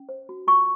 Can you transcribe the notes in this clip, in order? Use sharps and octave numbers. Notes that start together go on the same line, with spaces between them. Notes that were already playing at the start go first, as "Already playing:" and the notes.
Already playing: C#4
C5
F#4
F4 C#6